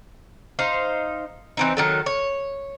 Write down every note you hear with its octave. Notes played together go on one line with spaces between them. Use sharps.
D#4 C5 F5
E3 C4 D#4
D#3 F#3 A4
C#5